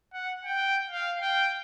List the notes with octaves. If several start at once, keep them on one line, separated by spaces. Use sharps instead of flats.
F#5
G5
F5
G5